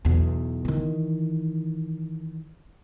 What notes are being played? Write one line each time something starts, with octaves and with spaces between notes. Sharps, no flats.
B1 E2
D#3 E3